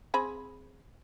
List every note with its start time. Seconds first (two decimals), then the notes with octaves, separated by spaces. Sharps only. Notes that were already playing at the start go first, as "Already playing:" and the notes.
0.14 C4 G#4 B5